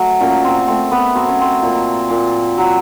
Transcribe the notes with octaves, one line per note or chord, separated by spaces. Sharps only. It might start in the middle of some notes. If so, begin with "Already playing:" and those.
Already playing: F#3 A3
A#2 C#4
C4
A3 C4
B3
F#3 C4
C#4
C4
A#2
A#2
F#3